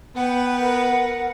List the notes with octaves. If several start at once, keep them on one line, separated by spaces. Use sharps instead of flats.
B3 B4 F#5 G5
A#4 F#5